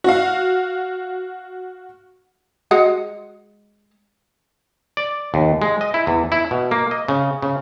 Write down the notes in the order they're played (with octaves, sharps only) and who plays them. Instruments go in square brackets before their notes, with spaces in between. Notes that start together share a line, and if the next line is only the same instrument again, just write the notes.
[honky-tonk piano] F#4 F5
[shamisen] G#3 F#4 F#5
[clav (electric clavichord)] D5
D#2
G#3
D#5
E4
E2
E4
B2
A#3
D#5
C#3
C#3